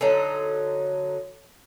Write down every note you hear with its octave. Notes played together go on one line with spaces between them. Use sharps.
D3 F#3 D#4